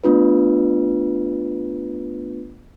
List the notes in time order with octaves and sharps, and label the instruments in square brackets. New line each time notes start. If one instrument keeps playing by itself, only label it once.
[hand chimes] A3 B3 D4 F4 B4